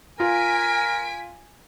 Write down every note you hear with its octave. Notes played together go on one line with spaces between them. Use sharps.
F4 A#4 G#5 B6 D7